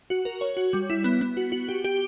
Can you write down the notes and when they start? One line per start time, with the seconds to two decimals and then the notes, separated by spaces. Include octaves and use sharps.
0.10 F#4
0.25 A#4
0.41 C#5
0.57 F#4
0.73 G3
0.90 E4
1.04 B3
1.21 B3
1.37 F#4
1.52 F#4
1.69 G4
1.84 G4